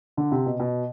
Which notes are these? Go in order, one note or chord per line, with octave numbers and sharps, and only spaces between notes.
D3
C3
B2
B2